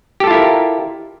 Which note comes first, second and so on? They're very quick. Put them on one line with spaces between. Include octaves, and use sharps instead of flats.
G4 A4 F4 E4 A#4